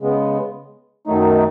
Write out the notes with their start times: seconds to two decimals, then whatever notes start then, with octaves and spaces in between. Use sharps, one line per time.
0.01 C#3 G#3 B3
1.07 F#2 D#3 F#3 A3 D#4